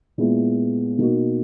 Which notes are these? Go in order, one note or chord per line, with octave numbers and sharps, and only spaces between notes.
A#2 G#3 B3 E4
B2 A#3 D#4 F#4